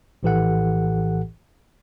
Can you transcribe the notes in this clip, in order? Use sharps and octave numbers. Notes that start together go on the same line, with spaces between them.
A#1 A2 E3 G4 A4 F#5